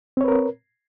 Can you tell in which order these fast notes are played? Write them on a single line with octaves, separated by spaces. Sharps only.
C4 C#5 B4 A#4